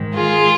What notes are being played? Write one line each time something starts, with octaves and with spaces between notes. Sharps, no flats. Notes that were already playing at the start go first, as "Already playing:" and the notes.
Already playing: G#2 D#3
F4 G#4